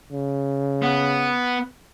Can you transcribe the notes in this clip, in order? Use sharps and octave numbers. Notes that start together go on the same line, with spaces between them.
C#3
B3